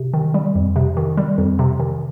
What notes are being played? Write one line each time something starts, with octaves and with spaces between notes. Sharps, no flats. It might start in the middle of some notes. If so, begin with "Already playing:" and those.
Already playing: C3
D#3
G3
F2
C3
D#3
G3
F2
C3
D#3